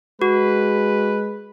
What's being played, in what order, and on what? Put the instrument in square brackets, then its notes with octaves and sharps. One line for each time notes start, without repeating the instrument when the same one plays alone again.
[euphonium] G#3 [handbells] F#4 [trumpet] B4